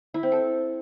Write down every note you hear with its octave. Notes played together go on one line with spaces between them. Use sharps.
E4
C4
A4